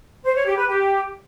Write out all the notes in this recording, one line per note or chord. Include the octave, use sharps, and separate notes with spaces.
C5
C#5
G4
B4
G4